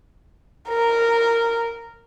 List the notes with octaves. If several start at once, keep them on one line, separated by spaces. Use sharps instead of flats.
A#4